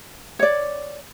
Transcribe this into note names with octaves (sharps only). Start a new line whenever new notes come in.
C#5 D5